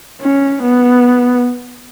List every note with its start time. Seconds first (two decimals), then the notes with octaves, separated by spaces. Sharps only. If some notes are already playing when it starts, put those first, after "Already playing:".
0.22 C#4
0.63 B3